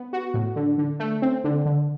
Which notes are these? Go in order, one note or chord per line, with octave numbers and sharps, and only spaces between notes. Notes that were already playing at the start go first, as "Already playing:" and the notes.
Already playing: B3
F#4
A2
D3
D3
A3
C4
D3
D3